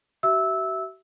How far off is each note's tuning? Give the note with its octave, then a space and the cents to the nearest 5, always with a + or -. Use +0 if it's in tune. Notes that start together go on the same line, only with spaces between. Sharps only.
F#4 +45 E5 +0 E6 -15